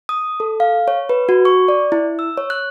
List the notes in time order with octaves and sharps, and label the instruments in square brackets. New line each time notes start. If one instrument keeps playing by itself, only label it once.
[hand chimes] D#6
A4
F5
C#5
B4
F#4
C#6
D5
E4
E6
C#5
F#6